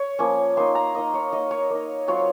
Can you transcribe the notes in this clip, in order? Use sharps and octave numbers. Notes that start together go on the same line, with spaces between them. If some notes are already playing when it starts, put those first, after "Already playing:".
Already playing: C#5
F3 A#3 C#4
A#3 D#4 C6
A#5
A#3 D#4 D#5
C#5
A#3 D#4 D#5
C#5
A#3 D#4
F#3 C4 F4 C#5